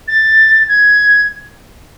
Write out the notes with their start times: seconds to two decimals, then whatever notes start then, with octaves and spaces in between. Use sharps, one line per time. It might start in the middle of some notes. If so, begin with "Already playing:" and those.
0.08 A6
0.68 G#6